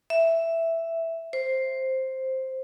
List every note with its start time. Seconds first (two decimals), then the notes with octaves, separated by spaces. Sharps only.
0.10 E5
1.33 C5